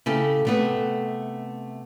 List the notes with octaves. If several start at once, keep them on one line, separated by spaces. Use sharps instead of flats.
C#3 A3 E4 G4 A4
C3 A3 B3